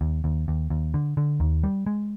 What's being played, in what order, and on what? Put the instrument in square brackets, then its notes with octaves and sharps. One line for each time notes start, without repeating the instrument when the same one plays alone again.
[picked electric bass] D#2
D#2
D#2
D#2
D3
D3
D#2
G3
G#3